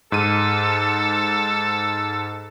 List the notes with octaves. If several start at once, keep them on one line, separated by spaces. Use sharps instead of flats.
G#2 A4 D#7